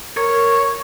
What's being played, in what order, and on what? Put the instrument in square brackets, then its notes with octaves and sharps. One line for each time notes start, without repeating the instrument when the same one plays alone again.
[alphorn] A#4 [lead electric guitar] C#5